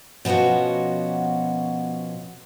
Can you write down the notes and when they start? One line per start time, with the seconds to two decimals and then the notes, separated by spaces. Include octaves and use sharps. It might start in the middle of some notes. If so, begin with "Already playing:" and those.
0.25 B2 F3 B3 C#4 F#4